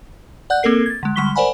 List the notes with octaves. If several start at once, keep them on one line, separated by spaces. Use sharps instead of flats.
D5 F#5 F#6 G6
A#3 C4 A4 A#4 C7
G#6 A6
D3 G#3
D3 G3 G#3 C#6 B6 G7
A#4 C5 D5 F#5 G#5 B5